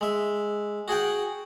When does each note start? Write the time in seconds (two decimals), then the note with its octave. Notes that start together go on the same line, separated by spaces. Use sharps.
0.01 G#3 E5
0.88 F#4 G#4 F#5 G5